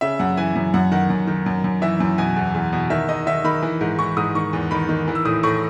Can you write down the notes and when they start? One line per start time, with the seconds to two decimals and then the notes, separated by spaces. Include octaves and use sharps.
0.01 C#3 E5
0.19 F#2 F#5
0.37 E3 G#5
0.55 F#2
0.74 F#2 F#5
0.92 D#3 F#5
1.10 F#2
1.27 D#3
1.46 F#2
1.64 F#2
1.82 E3 E5
2.00 F#2
2.18 B2 G#5
2.36 E2
2.54 E2
2.72 B2
2.90 D#3 E5
3.09 D#3 D#5
3.26 D#3 E5
3.44 D#3 B5
3.62 E3
3.81 G#2
3.98 E3 C#6
4.17 G#2 D#6
4.35 D#3 C#6
4.53 E2
4.71 D#3 B5
4.89 D#3
5.08 E3
5.15 E6
5.25 A2 D#6
5.43 A2 C#6